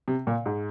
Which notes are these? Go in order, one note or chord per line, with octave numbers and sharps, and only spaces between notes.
C3
A#2
G#2